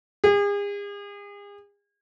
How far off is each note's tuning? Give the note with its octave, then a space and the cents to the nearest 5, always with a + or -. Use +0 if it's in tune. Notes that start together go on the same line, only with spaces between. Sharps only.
G#4 -40